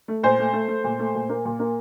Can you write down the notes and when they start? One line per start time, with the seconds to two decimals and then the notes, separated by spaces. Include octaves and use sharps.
0.08 A3
0.23 A#2 C5
0.39 A3
0.53 A3
0.68 A3
0.84 A#2
0.99 A3
1.15 A#2
1.29 A#3
1.45 A#2
1.59 A#3